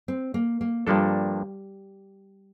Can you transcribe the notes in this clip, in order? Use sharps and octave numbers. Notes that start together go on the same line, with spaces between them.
C4
A#3
A#3
G2 F3 G3 A#3 D4 A4